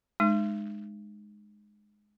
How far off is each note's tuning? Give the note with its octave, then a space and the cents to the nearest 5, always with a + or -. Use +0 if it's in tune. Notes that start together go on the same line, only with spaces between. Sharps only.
G#3 +5 D#4 -30